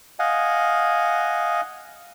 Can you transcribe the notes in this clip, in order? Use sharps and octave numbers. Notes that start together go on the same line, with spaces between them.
D#5 F5 F#5 G#5